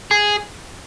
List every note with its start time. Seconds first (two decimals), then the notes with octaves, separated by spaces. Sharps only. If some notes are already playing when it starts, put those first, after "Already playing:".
0.11 G#4